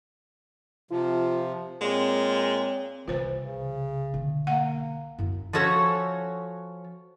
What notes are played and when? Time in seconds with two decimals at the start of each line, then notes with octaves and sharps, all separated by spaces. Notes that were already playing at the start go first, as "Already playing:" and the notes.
0.91 C3 F3 F4
1.81 A#2 G#3 C4 C#5 G5
3.08 C2 E3 F4 C5
3.43 C#3
4.14 B1 D3
4.47 A#3 F#5
5.19 F#2 E4
5.53 F3 C#4 F#4 A4 C#5